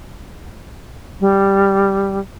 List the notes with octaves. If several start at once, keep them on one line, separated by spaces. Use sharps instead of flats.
G3